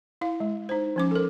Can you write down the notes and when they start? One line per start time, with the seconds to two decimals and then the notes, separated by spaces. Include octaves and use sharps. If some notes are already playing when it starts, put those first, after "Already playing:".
0.21 E4 F5
0.40 G#3
0.69 D#4 C5
0.96 F3 C#4 D6
1.11 A4 A#4